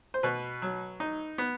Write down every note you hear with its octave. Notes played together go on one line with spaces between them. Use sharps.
C5
B2 B4
F#3
D#4
B3